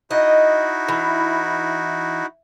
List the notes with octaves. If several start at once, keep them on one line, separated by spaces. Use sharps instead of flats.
D#4 E4 F#4 D#5
E3